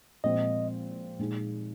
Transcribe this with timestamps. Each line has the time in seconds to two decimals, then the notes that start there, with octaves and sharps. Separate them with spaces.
0.24 A#2 F3 G#3 C4 D#5
1.19 A#2 G#3 D#4 G#4